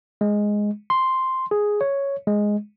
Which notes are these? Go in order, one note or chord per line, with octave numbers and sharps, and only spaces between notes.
G#3
C6
G#4
C#5
G#3